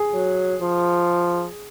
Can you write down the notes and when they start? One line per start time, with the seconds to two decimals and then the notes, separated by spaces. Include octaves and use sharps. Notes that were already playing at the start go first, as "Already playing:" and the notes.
Already playing: G#4
0.14 F#3
0.62 F3